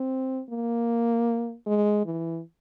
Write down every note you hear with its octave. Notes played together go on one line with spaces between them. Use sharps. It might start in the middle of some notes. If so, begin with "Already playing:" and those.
Already playing: C4
A#3
G#3
E3